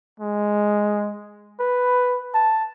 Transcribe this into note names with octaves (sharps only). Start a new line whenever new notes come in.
G#3
B4
A5